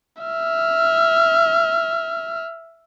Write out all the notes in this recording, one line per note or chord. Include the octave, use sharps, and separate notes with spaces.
E5 F6